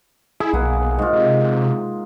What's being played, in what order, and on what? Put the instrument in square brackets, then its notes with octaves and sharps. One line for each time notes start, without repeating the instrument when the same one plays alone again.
[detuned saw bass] E4 [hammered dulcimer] G#4
[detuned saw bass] B1 [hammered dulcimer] A#3 E4 F#5
[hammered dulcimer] G#2 F4
[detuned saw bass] C3